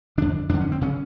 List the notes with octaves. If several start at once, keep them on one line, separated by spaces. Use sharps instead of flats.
F2 D3 D4
F2 D3 D4
C#4
C4
C#3 C#4